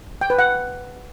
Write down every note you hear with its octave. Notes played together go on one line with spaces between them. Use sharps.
G5
B4
F#5